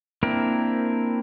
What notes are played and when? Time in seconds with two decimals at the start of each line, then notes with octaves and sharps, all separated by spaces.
0.23 A#3 C4 D4 E4 A#4